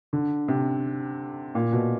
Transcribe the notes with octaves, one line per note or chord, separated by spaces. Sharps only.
D3
C3
A#2
B2